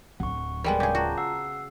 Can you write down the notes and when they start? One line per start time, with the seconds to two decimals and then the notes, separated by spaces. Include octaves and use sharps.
0.20 D1 F#3 F#5 C#6
0.64 G3 G#3 B3 A#4 D5 G5
0.80 C#3 G#4 D6 G6
0.95 F4 F#4 A5 A#5
1.18 F#5 E6 C7